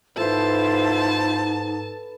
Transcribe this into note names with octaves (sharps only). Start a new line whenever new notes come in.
G#2 E4 F4 A4 B4 C5 A5